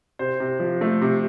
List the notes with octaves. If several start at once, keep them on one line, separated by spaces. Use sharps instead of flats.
C3 C5
C3
F3
A3
C3